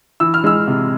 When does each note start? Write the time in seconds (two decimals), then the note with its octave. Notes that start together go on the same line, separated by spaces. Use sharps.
0.20 E3 E6
0.34 F6
0.44 G#3 E6
0.67 C3